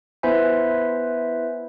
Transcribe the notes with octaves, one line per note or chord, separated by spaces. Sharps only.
B3 E4 B4 C5 E5 G#5